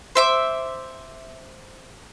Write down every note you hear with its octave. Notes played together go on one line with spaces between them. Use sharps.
C5 E5 D6